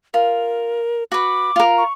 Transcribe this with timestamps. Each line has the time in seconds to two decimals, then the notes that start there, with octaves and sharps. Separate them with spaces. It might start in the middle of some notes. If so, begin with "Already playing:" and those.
0.14 F4 A#4
1.12 F#4 B4 D6
1.56 F4 A#4
1.78 C#6